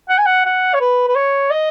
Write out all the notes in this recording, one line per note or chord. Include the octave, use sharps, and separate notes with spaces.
F#5
G#5
F#5
F#5
C#5
B4
B4
C#5
D#5